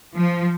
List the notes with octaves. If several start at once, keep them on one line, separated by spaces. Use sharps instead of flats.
F3